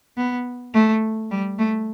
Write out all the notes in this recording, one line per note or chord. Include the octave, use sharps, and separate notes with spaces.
B3
A3
G3
A3